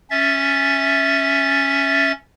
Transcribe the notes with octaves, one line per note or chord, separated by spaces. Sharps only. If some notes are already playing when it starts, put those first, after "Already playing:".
C#4 E5 A6